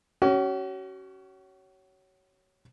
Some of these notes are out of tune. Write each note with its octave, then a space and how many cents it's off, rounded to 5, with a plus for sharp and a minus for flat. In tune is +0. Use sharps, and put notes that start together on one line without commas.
C#4 +0 F#4 +40